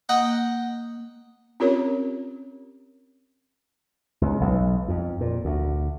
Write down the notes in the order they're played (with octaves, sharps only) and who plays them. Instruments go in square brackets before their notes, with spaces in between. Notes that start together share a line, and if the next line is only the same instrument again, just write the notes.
[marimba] A#3 [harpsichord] D#5 F#5 G5
[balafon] C4 C#4 F4 G4 A#4 C#5
[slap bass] C#2
B1
F2
A#2
D2